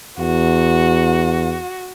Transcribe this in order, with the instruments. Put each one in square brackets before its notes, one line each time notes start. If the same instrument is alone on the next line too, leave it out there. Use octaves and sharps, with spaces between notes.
[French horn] E2 [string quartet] F#4